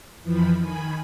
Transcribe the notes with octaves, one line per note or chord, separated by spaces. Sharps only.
F2 E3 F3 B5
D#3 G#5 B5